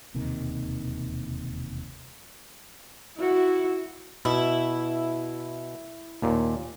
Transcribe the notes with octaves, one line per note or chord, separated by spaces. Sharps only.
E1 D#2 C3 D#3
E4 F#4
B2 E4
D#2 A#2